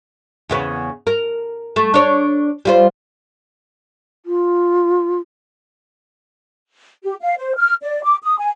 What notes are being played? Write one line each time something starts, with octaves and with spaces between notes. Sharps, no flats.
E2 C#3 B3
A#4
A3
D4 C#5
G3 F4 C5
F4
G4
F5
C5
F6
D5
D6
D#6
G#5